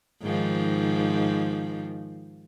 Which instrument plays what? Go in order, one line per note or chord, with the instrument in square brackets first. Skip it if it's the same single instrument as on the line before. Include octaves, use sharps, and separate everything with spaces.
[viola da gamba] G#2 D#3 F3